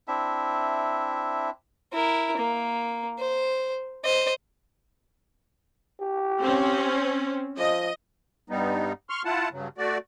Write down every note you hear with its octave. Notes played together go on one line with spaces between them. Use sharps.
C4 D4 E4 E5
E4 A#4
A#3
C5
C5 D#5
G4
C4 C#4
F3 D#5
G2 G3 B3 D#4
C6 C#6 F6
E4 F4 F#5 A5
G2 C#3 F#3
A3 F#4 D5